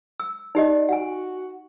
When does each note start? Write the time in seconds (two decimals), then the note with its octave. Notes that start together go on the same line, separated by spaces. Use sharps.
0.20 E6
0.55 D#4 G4 D5 D#5
0.89 F#4 F#5 G#5